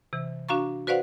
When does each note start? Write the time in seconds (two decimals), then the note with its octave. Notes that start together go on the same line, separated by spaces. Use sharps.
0.13 C3 E3
0.49 D4 F#4 F5 A#5 C#6
0.87 F#4 B4 C5 D5 F5 F#5